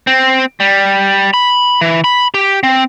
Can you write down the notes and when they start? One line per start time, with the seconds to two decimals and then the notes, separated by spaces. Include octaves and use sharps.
0.07 C4
0.60 G3
1.34 B5
1.81 E3
2.04 B5
2.34 G4
2.63 C4